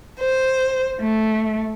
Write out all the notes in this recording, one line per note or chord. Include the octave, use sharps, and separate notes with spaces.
C5
A3